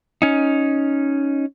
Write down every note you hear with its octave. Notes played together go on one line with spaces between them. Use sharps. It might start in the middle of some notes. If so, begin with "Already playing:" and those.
C#4 D#4